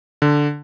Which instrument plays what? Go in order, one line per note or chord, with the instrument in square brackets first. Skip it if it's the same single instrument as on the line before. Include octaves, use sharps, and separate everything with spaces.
[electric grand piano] D3